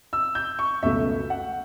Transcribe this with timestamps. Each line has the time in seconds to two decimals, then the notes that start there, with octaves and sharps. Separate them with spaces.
0.13 E6
0.35 G6
0.59 C#6
0.83 C#2 B2 A3 E5
1.30 F#5